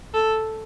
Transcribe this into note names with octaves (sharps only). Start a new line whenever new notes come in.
A4